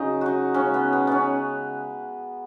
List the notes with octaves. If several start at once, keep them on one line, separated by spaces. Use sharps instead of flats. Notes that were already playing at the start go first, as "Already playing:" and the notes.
Already playing: C#3 F#3 D#4
D#4 F#4
C#3 G#3 C#4
B3
B3
B3 C#4